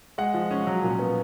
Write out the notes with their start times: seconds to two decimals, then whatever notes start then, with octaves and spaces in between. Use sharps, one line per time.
0.18 G#3 F#5
0.34 F3
0.51 C#4
0.67 F#3
0.83 A#2
0.99 B3